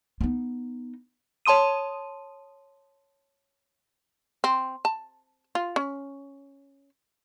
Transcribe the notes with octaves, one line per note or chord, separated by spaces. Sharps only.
B3 D#4
C#5 A5 C6 D#6 D#7
C4
A5
F4
C#4